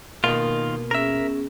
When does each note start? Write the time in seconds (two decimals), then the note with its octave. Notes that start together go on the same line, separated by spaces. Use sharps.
0.24 B2 D#3 A#3 F4
0.91 B3 C#4 G#4 A#4 E5